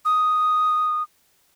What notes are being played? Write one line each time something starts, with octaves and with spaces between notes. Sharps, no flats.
D#6